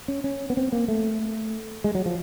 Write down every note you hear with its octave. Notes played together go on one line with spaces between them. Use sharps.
C#4
C#4
B3
C4
A#3
A3
G#3
F#3
F3